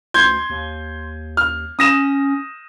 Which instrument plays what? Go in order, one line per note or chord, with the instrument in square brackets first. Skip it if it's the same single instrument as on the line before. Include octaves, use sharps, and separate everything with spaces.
[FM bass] D2 [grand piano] C6 G6 G#6
[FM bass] D#2
[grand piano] F6
[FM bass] C#4 [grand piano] D#6 A#6 E7